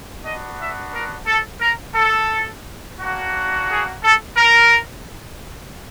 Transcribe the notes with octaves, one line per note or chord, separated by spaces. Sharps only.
B3 D4 F#4 D#5
E5
A#4
A4
A#4
A4
A#3 D4 F#4
G#4
A4
A#4